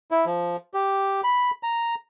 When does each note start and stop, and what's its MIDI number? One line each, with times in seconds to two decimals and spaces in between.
0.11 0.25 64
0.26 0.56 53
0.74 1.21 67
1.24 1.51 83
1.63 1.95 82